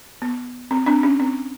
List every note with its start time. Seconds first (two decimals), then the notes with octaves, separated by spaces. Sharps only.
0.22 B3
0.71 C4
0.86 C4 D4
1.03 C#4
1.20 C4